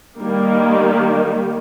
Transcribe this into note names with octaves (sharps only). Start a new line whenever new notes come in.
D#3 G3 A#3